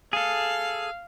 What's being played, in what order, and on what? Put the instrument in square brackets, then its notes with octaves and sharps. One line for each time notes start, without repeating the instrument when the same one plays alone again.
[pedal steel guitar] G#4 A4 [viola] F5